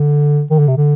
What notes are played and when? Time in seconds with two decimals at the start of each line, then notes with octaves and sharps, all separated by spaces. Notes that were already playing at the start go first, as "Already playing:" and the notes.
Already playing: D3
0.51 D#3
0.59 D3
0.68 C3
0.77 D3